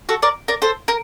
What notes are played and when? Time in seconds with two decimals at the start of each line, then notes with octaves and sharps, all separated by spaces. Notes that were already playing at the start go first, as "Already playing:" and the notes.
0.09 F#4 A4
0.22 A#4 D5
0.48 A#4 D5
0.62 A4 C5
0.88 A#4